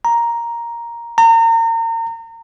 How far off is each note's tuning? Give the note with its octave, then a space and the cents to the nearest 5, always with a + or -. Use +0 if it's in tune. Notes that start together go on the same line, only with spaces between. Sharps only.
A#5 +5
A#5 -35